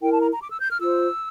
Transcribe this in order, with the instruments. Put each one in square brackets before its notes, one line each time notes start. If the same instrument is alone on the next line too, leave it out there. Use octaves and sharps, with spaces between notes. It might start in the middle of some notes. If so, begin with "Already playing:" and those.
[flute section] E4 A#4 G5
A5
A#5
A#5
D6
E6
G6
F6
F4 C5 E6